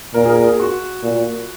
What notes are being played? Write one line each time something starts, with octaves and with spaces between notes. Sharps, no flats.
A#2 A#4
G#4
A#4
G#4
F#4
A#2